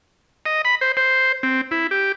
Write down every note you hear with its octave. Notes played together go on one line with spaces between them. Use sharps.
D#5
B5
C5
C5
C4
E4
G4